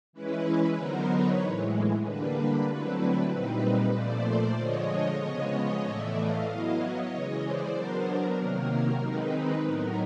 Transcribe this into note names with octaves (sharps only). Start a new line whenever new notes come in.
E3 G#3 C#4 E4 B4
D3 F#3 B3 D#4 A#4 C5
B4 C#5
A2 E3 G#3
D3 G3 A#3 D4 B4
D3 F#3 A3 C4 E4 B4
A#2 G3 C4 D#4 B4
A#2 F3 A3 C5 D5
D3 F3 G#3 C#5 D#5
C#3 F3 G#3 B3
A2 E3 A3 D5 E5
D#5 F5
F#3 B3 E4 D#5 F5
C#5 D#5
C#3 E3 G#3
C5 D5
F#3 B3 D4 A#4 C5
A#4
C3 D#3 F#3 A#3
A#4
D#3 G#3 C4 D#4 B4
A2 F#3 B3 D#4 A#4